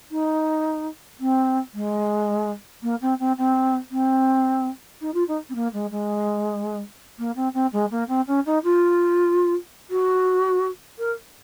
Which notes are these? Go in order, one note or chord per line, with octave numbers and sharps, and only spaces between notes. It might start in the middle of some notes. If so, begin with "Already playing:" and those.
D#4
C4
G#3
A#3
C4
C4
C4
C4
D#4
F4
D#4
C4
A#3
G#3
G#3
A#3
C4
C4
G#3
A#3
C4
C#4
D#4
F4
F#4
A#4